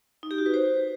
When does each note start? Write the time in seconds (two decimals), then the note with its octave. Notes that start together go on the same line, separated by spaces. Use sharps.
0.23 D#4
0.31 G4
0.38 F#4
0.46 B4
0.54 C5